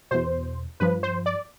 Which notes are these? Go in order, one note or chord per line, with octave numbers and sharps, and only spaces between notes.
E2 B2 C5
G2 F3 B4
C5
D5